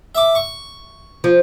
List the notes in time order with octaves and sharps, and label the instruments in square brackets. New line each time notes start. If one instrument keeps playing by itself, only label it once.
[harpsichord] E5 D6
C#6
[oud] F3